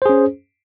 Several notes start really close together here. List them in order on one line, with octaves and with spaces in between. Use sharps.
C5 G#4 C#4